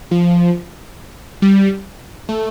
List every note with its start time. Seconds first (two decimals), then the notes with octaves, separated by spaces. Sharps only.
0.11 F3
1.42 G3
2.29 A3